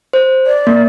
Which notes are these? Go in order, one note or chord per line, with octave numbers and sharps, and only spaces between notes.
C5
D5
A#3